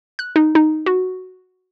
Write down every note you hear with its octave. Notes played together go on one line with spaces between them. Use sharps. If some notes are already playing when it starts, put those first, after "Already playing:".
F#6
D#4
D#4
F#4